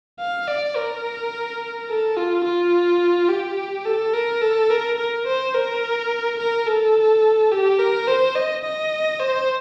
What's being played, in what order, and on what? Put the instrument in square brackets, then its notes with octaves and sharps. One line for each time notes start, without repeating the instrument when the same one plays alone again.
[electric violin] F5
D5
A#4
A4
F4
F4
G4
A4
A#4
A4
A#4
A#4
C5
A#4
A#4
A4
G4
A#4
C5
D#5
D#5
C5